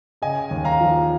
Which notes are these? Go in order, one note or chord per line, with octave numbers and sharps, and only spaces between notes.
C#3 D#5 G#5
D#2
F5 A#5
F3